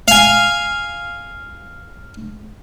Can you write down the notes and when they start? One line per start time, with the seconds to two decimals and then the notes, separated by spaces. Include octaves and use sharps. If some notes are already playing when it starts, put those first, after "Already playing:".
0.08 F5 G#5